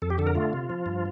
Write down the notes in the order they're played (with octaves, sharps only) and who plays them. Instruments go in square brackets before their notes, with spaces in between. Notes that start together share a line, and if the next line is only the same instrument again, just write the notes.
[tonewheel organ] F2 A4
G4
D3 A4
A#4
A3 F4
C3
F3
G2